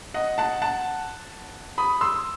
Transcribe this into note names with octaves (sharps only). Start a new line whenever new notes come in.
D#5 F#5
F#5 A5
F#5 A5
B5 D#6
C6 E6